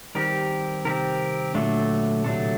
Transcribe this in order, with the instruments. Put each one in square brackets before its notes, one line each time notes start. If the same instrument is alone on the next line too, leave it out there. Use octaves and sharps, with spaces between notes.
[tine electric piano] D#3 G3 [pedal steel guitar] C4 G4 A#4
[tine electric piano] C3 D#3 [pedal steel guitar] C4 G4 A#4
[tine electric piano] A#2 D3 [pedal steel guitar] F#3 A3 D4 A4
[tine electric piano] A2 C3 [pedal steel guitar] F#3 A3 D4 A4